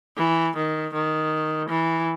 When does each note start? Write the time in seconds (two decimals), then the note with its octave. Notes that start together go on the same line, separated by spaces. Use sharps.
0.17 E3
0.56 D#3
0.94 D#3
1.69 E3